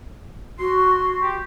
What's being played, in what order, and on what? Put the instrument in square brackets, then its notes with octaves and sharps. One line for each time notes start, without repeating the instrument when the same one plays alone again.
[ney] F#4 [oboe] C6
[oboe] G4